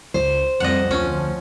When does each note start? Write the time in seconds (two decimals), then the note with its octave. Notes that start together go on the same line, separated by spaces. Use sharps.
0.14 C#2 C5
0.60 F2 G3 C4 D#5 F#5
0.91 D2 F3 C#4